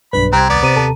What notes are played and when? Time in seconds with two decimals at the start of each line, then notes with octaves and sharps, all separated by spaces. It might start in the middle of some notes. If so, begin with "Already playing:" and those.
0.13 B1 G2 D4 B4 B5
0.33 C2 C4 G4 A#5 F#6 G#6
0.50 D#2 B3 D5 A6
0.63 C3 C5 A#5 D#7
0.76 D#2 A4 A5